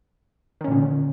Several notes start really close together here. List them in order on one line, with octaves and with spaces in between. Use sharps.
D#3 C#4 A#2 D3